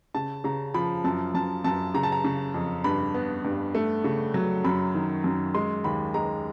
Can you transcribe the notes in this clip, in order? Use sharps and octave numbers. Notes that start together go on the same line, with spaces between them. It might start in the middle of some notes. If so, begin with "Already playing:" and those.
C#3 A5
C#3 A#5
F3 B5
F#2 A5
F#2 A5
F#2 A5
C#3 A#5
A5
A#5
C#3
F2
G2 B5
B3
G2
A3
C#3
F#3
F#2 B5
D#3
F#2
G#3 C6
D#2 B5
G#3 A#5